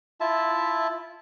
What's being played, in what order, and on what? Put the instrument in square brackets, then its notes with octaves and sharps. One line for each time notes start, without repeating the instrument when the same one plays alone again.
[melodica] E4 F4 E5 A5